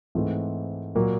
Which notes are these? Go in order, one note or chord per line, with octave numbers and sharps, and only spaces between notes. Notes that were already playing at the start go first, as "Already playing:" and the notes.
G#2 E3 A3 C4
A#2 F#3 A#3